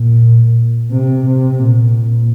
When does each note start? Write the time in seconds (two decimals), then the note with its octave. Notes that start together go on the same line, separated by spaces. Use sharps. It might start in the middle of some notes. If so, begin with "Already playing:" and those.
Already playing: A#2
0.91 C3
1.25 C3
1.59 A#2
1.93 A#2